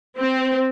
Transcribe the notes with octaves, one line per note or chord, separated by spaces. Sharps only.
C4